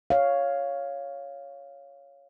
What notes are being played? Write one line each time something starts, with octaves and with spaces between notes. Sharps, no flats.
C#5 F5